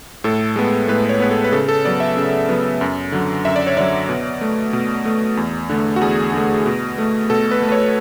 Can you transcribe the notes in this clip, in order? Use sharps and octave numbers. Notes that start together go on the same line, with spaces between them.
A2 A4
G#3 B3
A2 B4
B4
C#5
G#3 B3 B4
A4
B4
C#3 A4
A4
F#3 B3 D5
E5
C#3
F#3 B3
F#2
D3 F#3
F#2 E5
D5
C#5
D3 F#3 D5
B2
A3
B2
A3
E2
D3 A3
F#4
E2 G#4
D3 A3
B2
A3
B2 A4
B4
A3
B4
C#5